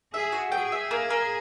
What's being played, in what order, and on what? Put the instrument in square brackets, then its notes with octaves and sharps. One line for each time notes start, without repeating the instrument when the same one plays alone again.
[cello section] G#4 [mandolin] E5
[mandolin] F#4
[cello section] G#4 [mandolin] G5
[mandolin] E5
A#3
A#3